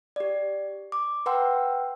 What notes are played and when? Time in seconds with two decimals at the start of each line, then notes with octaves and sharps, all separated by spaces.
0.16 G4 D5
0.92 D6
1.26 B4 F#5 G5 A#5 C6 E6